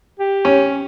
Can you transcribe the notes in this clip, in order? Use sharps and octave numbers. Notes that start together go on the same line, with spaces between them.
G4
C#4